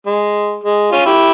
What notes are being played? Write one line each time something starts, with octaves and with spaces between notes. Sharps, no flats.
G#3
G#3
C#4 F4
E4 G4